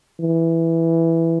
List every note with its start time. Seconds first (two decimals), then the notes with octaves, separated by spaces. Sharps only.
0.20 E3